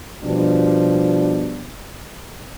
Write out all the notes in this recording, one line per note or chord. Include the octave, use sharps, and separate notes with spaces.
B2 F3 G3 D4